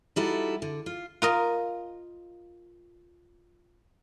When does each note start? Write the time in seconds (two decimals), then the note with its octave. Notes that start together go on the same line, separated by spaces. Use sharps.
0.16 G3 D#4 E4 F#4 A4
0.62 D3
0.86 F4
1.22 F4 A#4 D#5